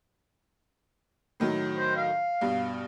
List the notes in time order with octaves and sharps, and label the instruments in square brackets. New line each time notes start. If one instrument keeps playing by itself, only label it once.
[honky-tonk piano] A2 D#3 F#3
[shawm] C5
F5
[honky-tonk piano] G2 B2